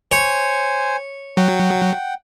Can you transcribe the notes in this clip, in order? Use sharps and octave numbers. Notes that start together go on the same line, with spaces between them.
C5 C#5 G#5
F#3 F#5 G5